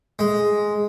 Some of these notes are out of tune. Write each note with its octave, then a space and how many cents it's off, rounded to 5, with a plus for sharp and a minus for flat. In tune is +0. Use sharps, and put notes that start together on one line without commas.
G#3 +5